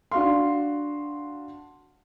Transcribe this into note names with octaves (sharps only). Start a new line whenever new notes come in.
D4 F#4 F5 C6